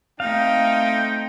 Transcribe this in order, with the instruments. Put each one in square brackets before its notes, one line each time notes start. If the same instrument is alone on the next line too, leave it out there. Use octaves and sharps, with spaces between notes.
[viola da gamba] A3 C4 [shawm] D#4 [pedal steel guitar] F5 [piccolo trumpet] G5